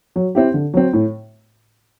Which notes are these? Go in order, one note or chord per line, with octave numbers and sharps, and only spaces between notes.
F#3
C4 E4 G4
D3
F#3 C4
A2